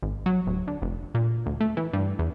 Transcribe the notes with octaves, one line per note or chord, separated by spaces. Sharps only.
G#1
F#3
D1
D3
F1
A#2
D2
A3
E3
G2
E2